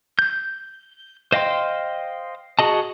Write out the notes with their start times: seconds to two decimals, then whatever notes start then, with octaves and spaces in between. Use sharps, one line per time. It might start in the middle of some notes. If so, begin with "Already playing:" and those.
0.19 G6
1.32 C5 D#5 F5 G5 C6
2.59 F#4 G#4 D#5 A5